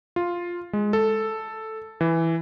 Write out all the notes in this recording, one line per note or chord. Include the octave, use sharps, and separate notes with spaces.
F4
G#3
A4
E3